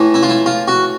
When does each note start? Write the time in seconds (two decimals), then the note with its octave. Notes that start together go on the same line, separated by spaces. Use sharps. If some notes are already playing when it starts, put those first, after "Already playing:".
Already playing: A2 E3
0.14 E4
0.23 F4
0.30 E4
0.46 F4
0.68 F#4